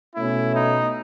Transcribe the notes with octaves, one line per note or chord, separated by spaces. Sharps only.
B2 A3 C#4 E4
D#4